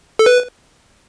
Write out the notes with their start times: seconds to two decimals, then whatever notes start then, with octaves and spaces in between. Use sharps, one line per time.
0.19 A4
0.26 B4